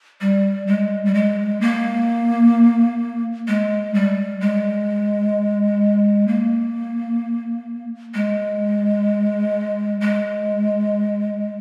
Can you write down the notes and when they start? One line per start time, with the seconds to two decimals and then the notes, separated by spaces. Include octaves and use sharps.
0.21 G3
0.67 G#3
1.05 G3
1.14 G#3
1.61 A#3
3.48 G#3
3.94 G3
4.41 G#3
6.28 A#3
8.15 G#3
10.01 G#3